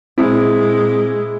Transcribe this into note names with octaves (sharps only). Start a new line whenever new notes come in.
A#2 G#3 C4 E4